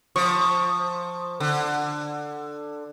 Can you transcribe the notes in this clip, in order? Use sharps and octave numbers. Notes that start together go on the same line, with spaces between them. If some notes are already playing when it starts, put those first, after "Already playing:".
F3 C#6
D3